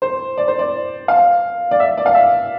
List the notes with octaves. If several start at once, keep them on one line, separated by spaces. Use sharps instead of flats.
C5
D5
C5
D5
F5
D5
E5
D5
F5
E5